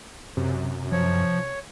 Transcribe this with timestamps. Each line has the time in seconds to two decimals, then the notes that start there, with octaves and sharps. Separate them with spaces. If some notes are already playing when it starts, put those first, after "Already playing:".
0.37 F#2 C3
0.92 F3 C#5